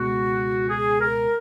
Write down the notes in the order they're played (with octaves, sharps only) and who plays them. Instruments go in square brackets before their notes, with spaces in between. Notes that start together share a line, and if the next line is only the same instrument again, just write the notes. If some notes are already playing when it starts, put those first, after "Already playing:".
Already playing: [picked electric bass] C#2 B2 G#3 B3 [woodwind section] F#4
[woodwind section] G#4
A#4